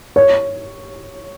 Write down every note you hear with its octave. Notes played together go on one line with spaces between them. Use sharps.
C#5